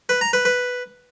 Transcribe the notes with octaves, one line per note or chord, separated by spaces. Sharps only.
B4
A#5
B4
B4